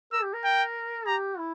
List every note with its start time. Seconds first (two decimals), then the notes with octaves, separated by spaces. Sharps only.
0.12 A#4 E6
0.23 G4
0.33 A#4
0.44 G5
1.06 G4 A#5
1.38 E4